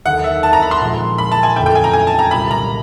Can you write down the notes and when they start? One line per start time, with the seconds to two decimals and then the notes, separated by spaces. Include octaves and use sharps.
0.05 D#2 D3 F#3 F#5
0.24 E5
0.43 A5
0.53 A#5
0.62 B5
0.71 C6
0.81 A#2 F3 G#3 C4
1.18 B5
1.32 A5
1.43 G#5
1.56 F2 D3 F#3 A3 C#4 G5
1.66 G5
1.75 G#5
1.84 A#5
1.93 G#5
2.07 A5
2.19 A#5
2.31 C2 A#2 G3 B5
2.51 A#5